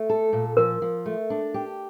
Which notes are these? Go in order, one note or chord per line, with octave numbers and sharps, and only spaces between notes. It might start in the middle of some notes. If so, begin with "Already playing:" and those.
Already playing: A3
A4
A#2
F3 A#4
F3
A3
D4
G4